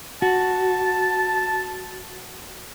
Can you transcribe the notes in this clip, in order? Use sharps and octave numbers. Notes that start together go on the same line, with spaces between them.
F#4 A5